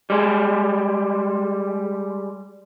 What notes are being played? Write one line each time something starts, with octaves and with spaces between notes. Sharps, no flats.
G3 G#3